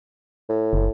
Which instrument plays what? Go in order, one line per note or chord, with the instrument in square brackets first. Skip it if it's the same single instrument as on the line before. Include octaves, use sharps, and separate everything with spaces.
[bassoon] A2
[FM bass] F#1